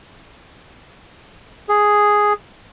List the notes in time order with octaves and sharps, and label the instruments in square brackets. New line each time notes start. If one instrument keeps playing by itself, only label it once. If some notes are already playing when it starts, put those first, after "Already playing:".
[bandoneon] G#4